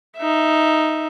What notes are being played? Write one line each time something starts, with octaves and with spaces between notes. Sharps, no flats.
D#4 E5